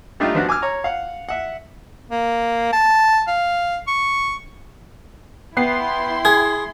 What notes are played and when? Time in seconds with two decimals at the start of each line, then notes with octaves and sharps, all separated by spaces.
0.20 G3 A3 D4 D#4 F4 G4
0.35 F3 B3 D4 F#4
0.49 G#5 D6 E6 F6
0.62 C#5 A#5
0.84 F5 F#5
1.29 E5 F#5
2.10 A#3
2.72 A5
3.27 F5
3.87 C#6
5.57 B3 E4 G5 C6 C7
6.25 G#4 G#6